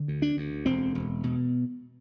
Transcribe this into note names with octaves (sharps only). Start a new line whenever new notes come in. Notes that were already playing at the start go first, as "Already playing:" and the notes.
Already playing: D3
D2
D4
D2
E1 C4
E1
B2